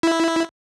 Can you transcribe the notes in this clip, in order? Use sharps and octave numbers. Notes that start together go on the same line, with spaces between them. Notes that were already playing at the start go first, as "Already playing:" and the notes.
E4